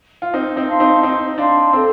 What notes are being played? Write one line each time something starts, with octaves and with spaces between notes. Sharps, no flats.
F4
C4 D#4 C5
C4 D#4
F5 A5 C6
C4 D#4
C4 D#4 C5
D4 F5 A5 C6
C4 A4